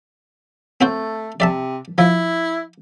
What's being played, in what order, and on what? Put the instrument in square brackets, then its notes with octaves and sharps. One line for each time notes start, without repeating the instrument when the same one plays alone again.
[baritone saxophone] A3 [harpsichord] C4 F#4 C5
[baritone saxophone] C3 [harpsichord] D5 E5 A5
[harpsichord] F3 [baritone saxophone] E4